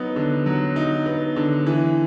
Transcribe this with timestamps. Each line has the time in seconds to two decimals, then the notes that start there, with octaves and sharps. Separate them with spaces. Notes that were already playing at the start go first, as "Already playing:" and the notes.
Already playing: F#3 B3 D#4
0.16 D3
0.46 F#3
0.76 D#4
1.06 B3
1.36 D3
1.66 E3